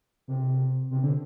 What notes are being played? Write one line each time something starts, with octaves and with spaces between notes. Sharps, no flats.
C3
C3
D3